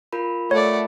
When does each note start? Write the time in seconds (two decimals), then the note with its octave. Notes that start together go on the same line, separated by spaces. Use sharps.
0.13 F4 A#4 B5
0.51 A3 C#5 D5 F#5